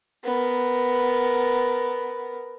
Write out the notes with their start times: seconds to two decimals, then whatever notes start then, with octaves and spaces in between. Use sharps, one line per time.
0.24 B3 A#4